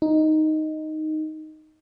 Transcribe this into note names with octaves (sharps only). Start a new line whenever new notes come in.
D#4